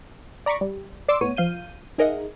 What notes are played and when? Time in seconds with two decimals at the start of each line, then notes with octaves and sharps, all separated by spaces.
0.46 D5 A#5 B5 C#6 D6
0.61 G3
1.08 D5 C6 D6 E6
1.21 A2 B3 C#5 D#7
1.37 F3 F5 G6 D#7
1.98 D#4 G#4 A#4 D#5 E5 F#5